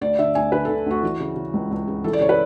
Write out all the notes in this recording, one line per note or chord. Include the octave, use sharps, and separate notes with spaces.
D2 D5
D3 E5
D2 G#5
D3 B4
D3 A4
D2 F#4
E3
C#3
C#3
C#2
C#2
C#3
E3 A4
D5
C#3 C#5
B4